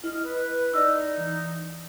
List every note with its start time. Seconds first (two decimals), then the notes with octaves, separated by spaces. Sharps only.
0.04 E4 D#5 F6
0.25 B4
0.74 D#4 D5 D#5 E6
1.17 E3